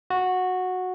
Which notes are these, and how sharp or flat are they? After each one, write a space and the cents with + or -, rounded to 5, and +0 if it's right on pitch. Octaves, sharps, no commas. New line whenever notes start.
F#4 -10